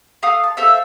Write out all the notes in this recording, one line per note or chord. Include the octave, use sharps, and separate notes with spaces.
A3 F5 D#6 F6
A5
A4 C5 E5 F5